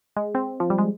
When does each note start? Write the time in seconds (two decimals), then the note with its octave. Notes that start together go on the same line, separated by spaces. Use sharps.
0.17 G#3
0.35 C4
0.60 F3
0.70 G3
0.78 G#3